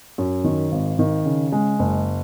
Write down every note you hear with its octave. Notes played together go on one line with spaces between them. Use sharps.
F#2
D#3
G#1
D#3
C#3
G#3
F#1